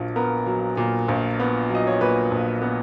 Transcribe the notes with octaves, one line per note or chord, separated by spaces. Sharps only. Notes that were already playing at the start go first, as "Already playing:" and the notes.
Already playing: A#1 A#2 F#3
B3 A#4
F#3
A#2
A#1
B3
F#3 D#5
C#5
A#2 B4
A#1
B3